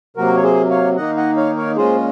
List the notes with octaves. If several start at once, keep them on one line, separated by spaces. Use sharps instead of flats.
C3 F#3 A#3 F#4 A#4
C#5
G#4 C5
C#5 F5
D#3 A#3 D#4 D#5 F#5
D#5 F#5
C#5 F5
A#4 C#5
A#2 G#3 C#4 F4 G#4 C5